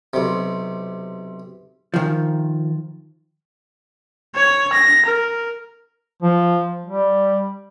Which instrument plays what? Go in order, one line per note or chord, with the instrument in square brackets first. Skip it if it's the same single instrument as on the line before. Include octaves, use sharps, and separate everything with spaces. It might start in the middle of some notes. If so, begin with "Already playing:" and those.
[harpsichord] B1 C3
[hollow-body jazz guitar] D#3 F3
[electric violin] C#5
A#6
A#4
[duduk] F3
G3